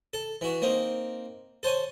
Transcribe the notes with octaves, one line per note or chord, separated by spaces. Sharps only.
A4
E3 F#4
A#3 C4 D#4
A4 C5 C#5 G#5